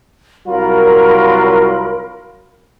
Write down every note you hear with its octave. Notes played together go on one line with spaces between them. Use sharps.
C2 F#3 F4 A#4 B5